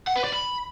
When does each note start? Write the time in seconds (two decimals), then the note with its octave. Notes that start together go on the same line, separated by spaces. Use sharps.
0.07 F#5
0.16 B4
0.24 D5
0.32 B5